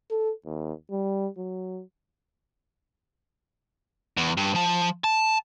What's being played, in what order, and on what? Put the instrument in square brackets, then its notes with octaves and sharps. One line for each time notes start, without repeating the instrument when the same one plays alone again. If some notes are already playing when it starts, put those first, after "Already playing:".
[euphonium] A4
D#2
G3
F#3
[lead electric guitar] E2
G2
F3 A5
A5